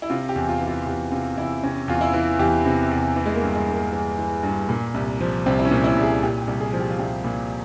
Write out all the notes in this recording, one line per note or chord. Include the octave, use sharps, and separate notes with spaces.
E4
C3 F4
G4
E2
F4
E3
F4
E2 G4
C3 F4
E2 E4
C3 C#4
E2 F4
E4
E3
E2 G4
C3
E2
E3
G#3
A#3
G2
G#3
G2
A#3
E3
E3
G2
A#2
C2
F3
C2 C4
E4
C#4
A#2
E4
C2
G#4
A#2 G4
G4
C2
G#4
F3
G4
F4
C2 G4
A#2